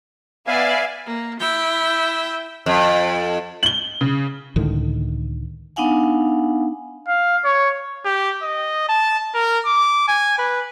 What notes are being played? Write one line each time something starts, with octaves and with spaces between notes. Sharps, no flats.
B3 D5 E5 F5 G#5
A#3
E4 G5
F2
F#7 G7
C#3
C#2 A2 D3 D#3
B3 D4 D#4 F5 F#5 G#5
F5
C#5
G4
D#5
A5
A#4
D6
G#5
B4